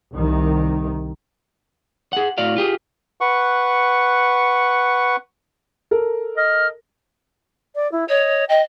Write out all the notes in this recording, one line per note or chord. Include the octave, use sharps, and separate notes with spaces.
C2 D#3
G#4 F#5
A2 F#4 D5 F5
F4 G4 G#4
B4 F#5 C#6
A4 A#4
D#5 F6
D5
E4
C#5 D#5
D#5 G5